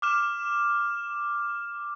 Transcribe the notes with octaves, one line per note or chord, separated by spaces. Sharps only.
D6 F6 E7